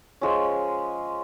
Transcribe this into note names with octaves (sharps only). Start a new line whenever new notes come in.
F3 G#3 C#4